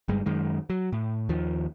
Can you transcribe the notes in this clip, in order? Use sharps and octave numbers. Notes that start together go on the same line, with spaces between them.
G1 G2 G3 G#3
F#2 D#3 G#3
F#3
A2
D#2 D#3 F3